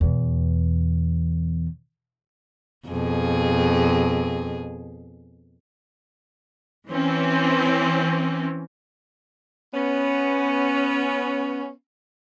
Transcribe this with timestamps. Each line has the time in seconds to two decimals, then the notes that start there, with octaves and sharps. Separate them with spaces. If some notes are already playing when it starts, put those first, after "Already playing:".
0.01 E2 B2
2.88 F2 B2 G#4
6.89 E3 C4 C#4
9.74 B3 C#4